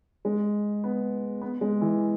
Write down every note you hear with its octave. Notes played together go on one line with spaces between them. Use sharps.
G#3
B3
B3
G#3
E3